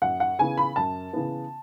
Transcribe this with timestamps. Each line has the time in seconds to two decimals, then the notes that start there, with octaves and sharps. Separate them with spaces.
0.02 F#2 F#5
0.20 F#5
0.39 C#3 E3 B3 G#5
0.58 B5
0.76 F#2 A5
1.13 C#3 E3 B3